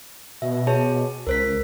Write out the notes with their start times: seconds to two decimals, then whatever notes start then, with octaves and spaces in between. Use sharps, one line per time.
0.42 B2 E5
0.67 G#4 C#5 A5
1.27 C#2 A#4 C5 B6